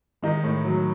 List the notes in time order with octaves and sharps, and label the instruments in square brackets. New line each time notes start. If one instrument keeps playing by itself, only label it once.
[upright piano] D#3 G#3 D#4
A2
F#3